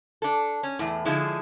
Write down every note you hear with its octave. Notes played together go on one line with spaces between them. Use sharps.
D4 A4
C#4
E2 A2
D3 F3 G#3 D#4 E4